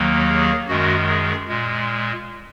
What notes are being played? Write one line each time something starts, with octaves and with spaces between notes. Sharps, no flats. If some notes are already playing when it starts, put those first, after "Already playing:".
Already playing: D#2 D#3 F#3 A#3
G#4
F#2 D#3 G#3 F#4
G#4
A#2 G#3